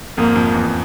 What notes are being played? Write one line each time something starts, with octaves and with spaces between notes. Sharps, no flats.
F2 G#2 A#3
F2
E2